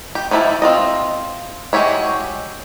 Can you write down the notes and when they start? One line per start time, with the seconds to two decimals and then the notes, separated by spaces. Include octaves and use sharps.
0.15 G4
0.31 D#3 F3 E4 F#4 A5
0.62 C4 F4 D#5
1.73 G#3 F#4 G4 C#5 E5